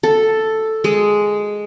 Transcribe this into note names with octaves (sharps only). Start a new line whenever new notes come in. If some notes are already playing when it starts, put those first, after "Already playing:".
A4
G#3